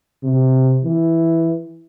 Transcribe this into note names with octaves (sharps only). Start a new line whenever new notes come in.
C3
E3